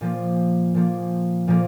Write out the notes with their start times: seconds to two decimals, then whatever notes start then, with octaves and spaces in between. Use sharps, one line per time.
0.01 A#2 F3 A#3
0.74 A#2 F3 A#3
1.48 A#2 F3 A#3